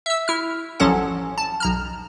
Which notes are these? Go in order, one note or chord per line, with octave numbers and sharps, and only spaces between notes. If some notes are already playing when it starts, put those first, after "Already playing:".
E5 E6
E4 F6
A1 F3 F#3 C#4 A4 F#5
A5
B1 A#5 F6